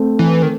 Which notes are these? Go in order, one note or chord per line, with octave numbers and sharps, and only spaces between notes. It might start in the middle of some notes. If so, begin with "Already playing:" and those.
Already playing: A3 C4
E3
D#3